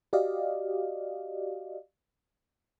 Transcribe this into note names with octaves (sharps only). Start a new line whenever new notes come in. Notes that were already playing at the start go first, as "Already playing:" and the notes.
F#4 G4 D5 D#5 F5